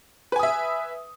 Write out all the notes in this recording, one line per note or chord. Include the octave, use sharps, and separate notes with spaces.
B4 E5 G#5 D#6